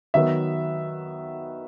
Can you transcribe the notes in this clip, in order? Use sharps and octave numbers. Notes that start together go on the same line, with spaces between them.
D#3 F#3 B3 E5